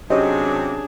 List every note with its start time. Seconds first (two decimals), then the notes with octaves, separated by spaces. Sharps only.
0.10 C3 F#3 C#4 D4 G4 G#4 D#5